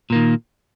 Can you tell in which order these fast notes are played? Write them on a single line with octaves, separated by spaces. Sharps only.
A#2 A#3 D#3